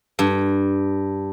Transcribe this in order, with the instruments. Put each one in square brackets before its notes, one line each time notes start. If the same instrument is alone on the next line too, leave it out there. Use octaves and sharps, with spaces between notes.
[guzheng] G2